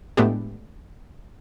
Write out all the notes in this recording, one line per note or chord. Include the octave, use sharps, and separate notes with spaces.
A2 G#3 A3 B3 D4 G4